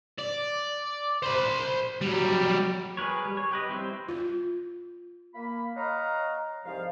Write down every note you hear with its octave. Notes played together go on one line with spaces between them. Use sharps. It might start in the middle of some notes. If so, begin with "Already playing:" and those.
D5
C5 B5
F#3 G3
G#4 A#4 B4 C#5
G3
C#5
G4 B4 D#5
G3 C4 E4 C5
F4
A#3 B5
C#5 D#5 F5 F#5 A#5
C2 G#2 F3 F5